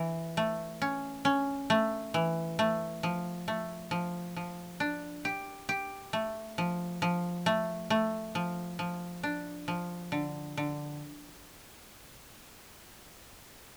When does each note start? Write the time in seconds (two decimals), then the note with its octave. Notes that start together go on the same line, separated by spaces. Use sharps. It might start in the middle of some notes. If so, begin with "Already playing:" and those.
Already playing: E3
0.37 A3
0.82 C#4
1.25 C#4
1.70 A3
2.14 E3
2.59 A3
3.03 F3
3.48 A3
3.91 F3
4.36 F3
4.80 D4
5.25 G4
5.69 G4
6.13 A3
6.58 F3
7.02 F3
7.46 A3
7.90 A3
8.35 F3
8.79 F3
9.23 D4
9.68 F3
10.12 D3
10.57 D3